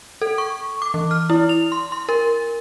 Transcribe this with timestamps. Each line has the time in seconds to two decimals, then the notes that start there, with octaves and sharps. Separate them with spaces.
0.22 A4
0.38 C#6
0.82 D6
0.94 E3
1.11 F6
1.30 E4
1.49 F7
1.72 C6
1.92 C6
2.09 A#4